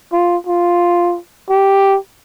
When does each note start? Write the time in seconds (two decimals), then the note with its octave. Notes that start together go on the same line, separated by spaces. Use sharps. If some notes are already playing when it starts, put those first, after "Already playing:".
0.13 F4
0.47 F4
1.50 G4